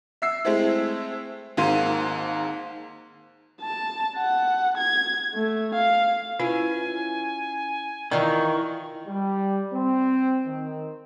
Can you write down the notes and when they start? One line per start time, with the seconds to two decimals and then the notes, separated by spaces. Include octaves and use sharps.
0.22 E5 E6 C7
0.45 G#3 A3 C4 E4
1.57 G#1 G#2 A#3 F5 C6 D#7
3.61 A5
4.17 F#5
4.78 G#6
5.35 A3
5.75 F5
6.40 C#4 E4 F4 B4 G#5
8.11 D#3 E3 E4 F4 D5 A#5 C#6
9.08 G3
9.73 C4
10.47 D#3